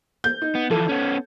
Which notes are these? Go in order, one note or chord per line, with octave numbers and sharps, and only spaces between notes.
G6
D#4
B3
E3 F3 A4
B3 C#4